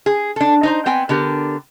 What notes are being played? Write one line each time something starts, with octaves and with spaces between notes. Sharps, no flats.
G#4
D4 A4
D#4 C5 A#5
B3 C4 G5 G#5
D3 B3 G4 A#4